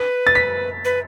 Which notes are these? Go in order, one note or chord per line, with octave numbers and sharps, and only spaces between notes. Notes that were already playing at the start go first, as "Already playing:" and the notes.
Already playing: B4
A6
B6
B4